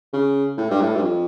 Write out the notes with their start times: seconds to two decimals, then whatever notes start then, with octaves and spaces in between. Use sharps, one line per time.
0.13 C#3
0.58 A2
0.70 G2
0.81 A2
0.96 G2
1.02 F2